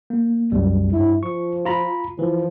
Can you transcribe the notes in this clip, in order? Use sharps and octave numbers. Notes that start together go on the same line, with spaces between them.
A#3
C2 F#2 G3
G2 E4
F3 C#6
F4 A#5 B5
E3 F3